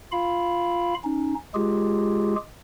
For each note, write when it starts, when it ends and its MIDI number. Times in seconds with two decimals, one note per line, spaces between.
0.12 0.94 65
0.12 0.94 77
0.12 0.94 83
1.04 1.34 61
1.04 1.34 63
1.54 2.35 56
1.54 2.35 65
1.54 2.35 67
1.54 2.35 68